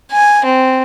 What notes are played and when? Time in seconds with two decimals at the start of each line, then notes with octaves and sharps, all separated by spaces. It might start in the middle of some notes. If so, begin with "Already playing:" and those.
0.12 G#5
0.45 C4